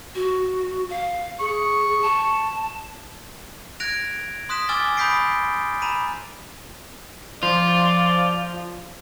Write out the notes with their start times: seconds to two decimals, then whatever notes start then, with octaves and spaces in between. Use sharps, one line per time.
0.15 F#4
0.90 F5
1.40 G#4 C#6
2.02 A5
3.80 F#6 G#6 A#6 D7 F7
4.49 C6 D#6 F#6 B6 E7
4.69 G#5 D6 E6 F6 A6 G7
4.97 B5 D#6 G6 B6 C7 D7
5.82 A#5 B5 D#7
7.43 F3 F4 D5